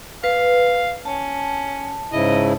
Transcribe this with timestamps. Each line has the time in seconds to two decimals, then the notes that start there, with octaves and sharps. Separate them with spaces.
0.24 B4 F5
1.05 C#4 A5
2.12 G#2 C#3 E4 D#5